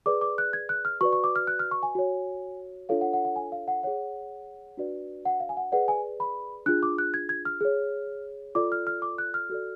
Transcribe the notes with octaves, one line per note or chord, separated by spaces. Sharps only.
G#4 B4 D5 D6
D6
F#6
G#6
F#6
F6
F#4 B4 D5 C#6
C#6
D6
F6
F#6
F6
C#6
G#5
F#4 C#5
D4 F4 A4 C#5 F5
F#5
F#5
F#5
G#5
F5
F#5
G#4 C#5 F#5
D4 F#4 B4 D5
F#5
F5
G#5
F#5
G#4 B4 D5 F#5
G#5
B5
D4 F4 G#4 F#6
D6
F#6
G#6
G#6
F6
G#4 C#5
F4 A4 D5 D6
F6
F6
D6
F#6
F6
F#4 A4 D5